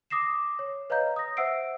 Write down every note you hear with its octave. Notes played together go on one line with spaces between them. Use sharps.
D6 D#6 A#6 C7 E7
C#5
B4 C#5 D#5 F5 A#5 G6
D#6 A#6
C5 E5 F#5 E6 C7 D7